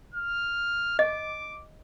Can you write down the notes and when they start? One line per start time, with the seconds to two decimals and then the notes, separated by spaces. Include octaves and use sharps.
0.14 F6
0.99 D#5 D6